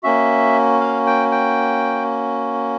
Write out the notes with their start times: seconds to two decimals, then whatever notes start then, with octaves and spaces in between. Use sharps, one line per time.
0.03 A#3 C#4 F#4 E5
0.81 F5
1.06 G5
1.32 G5